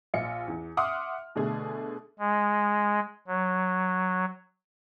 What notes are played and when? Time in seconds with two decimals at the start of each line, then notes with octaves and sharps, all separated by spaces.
0.14 A#1 F4 C#7
0.48 E2
0.77 E5 F#5 C6 D6 D#6 F6
1.35 B2 D3 A3 G#4
2.19 G#3
3.27 F#3